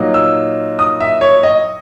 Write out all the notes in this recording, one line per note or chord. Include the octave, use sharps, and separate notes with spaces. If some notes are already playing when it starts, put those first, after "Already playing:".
Already playing: A#2 F#3 A#3 D#4
E6
D#6
E5
C#5
D#5